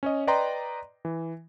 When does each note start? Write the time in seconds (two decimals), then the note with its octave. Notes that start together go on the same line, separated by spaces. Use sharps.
0.03 C#4 C#5 D#5
0.27 B4 D5 D#5 G5 A#5 C6
1.05 E3